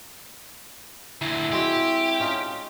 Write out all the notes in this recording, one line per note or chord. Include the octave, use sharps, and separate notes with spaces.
D2 A#2 E4
G#3 C4 F#4 G4
C#4 D#4 F4